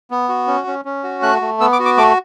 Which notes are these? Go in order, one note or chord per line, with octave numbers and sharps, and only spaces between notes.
B3
F#4
C#4
C#4
C#4
F#4
A3 F#6
A3
B3 E6
D6
F#4
D6
A3 D6